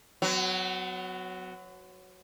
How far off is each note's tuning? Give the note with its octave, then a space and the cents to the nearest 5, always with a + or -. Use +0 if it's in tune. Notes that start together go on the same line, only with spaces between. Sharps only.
F#3 +0 B3 +40